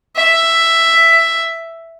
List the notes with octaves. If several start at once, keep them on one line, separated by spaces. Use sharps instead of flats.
E5